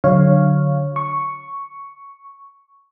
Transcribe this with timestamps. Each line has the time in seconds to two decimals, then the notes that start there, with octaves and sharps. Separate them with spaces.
0.04 D3 F#3 C#5 F5
0.96 C#6